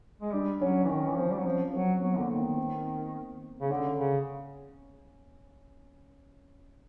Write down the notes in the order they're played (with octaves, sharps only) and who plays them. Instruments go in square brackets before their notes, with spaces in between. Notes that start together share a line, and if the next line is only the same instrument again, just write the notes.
[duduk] G#3
[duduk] G3 [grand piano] D4
[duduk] F#3 [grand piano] C#4
[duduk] E3
[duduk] D#3 [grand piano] C#4
[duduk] E3
[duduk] F3 [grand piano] C4
[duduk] G3
F#3
[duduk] F3 [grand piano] C#4
[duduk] F#3 [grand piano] C4
[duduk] F#3 [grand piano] B3
[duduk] D3 [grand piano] A#3
[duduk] D#3
[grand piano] B3
C4
[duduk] C#3
[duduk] D3 [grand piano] C#4
[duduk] C#3